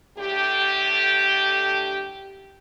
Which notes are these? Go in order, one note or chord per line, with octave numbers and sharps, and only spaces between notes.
A2 D3 G4